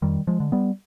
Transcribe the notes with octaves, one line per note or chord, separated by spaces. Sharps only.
F2 D#3 G3
F3 G#3
D3
G3 B3